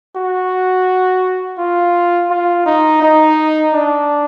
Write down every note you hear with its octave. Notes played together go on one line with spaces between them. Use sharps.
F#4
F4
F4
D#4
D#4
D4